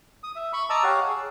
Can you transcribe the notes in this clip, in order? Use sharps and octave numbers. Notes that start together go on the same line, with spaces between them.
D#6
E5
B5 C#6
D#5 A5 A#5 D6 E6
G4 C#5 F5 F#5
G#4